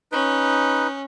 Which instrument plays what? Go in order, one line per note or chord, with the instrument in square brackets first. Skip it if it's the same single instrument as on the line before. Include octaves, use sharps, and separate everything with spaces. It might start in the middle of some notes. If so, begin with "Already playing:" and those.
[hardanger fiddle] C#4 [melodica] D#4 B4